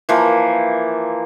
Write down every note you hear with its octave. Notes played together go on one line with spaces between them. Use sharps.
E3 F3 A#3